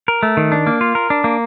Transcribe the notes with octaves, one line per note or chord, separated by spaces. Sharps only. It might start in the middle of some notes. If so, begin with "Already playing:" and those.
A#4
A3
D#3
D4
A#3
F4
A#4
D4
A#3